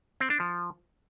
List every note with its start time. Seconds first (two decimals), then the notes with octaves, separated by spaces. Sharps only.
0.20 C4
0.30 D4
0.40 F3